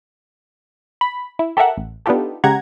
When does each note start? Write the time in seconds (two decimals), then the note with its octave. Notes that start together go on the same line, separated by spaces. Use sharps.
1.01 B5
1.39 E4
1.57 G4 A4 A#4 E5 F#5
1.77 A1
2.06 B3 D4 D#4 F4 G4 A4
2.44 C#3 G#3 G4 F#5 A#5 G#6